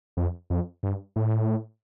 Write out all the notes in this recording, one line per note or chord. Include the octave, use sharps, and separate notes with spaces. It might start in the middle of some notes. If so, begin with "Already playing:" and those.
F2
F2
G2
A2